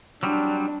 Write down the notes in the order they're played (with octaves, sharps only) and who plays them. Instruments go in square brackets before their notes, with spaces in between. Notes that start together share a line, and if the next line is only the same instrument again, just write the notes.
[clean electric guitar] F#3 G3 C4 [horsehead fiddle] D4